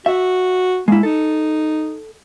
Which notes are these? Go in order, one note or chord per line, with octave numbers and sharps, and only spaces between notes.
F#4 E5
G#3 A#3 E4
D#4 A4